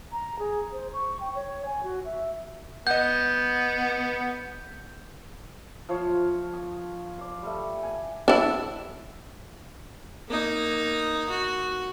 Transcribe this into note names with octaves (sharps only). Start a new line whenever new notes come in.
A#5
G#4
C5
C#6
G5
C#5
G#5
F#4
E5
B3 D#5 F#5 G6
F3 F4 C#5 F5
D#6
D5 F5
G3 A3
G#5
D4 E4
A#3 D#4
F#4